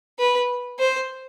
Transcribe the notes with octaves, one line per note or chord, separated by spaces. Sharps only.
B4
C5